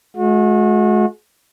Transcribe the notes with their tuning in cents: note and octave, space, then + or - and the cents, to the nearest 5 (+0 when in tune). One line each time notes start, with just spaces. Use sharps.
G#3 +40 F#4 -35